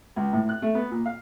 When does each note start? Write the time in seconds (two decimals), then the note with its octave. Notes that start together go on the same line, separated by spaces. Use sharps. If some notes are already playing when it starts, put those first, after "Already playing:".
0.16 C#2
0.33 A2
0.49 F#6
0.62 A3
0.75 B3
0.91 A#2
1.06 F5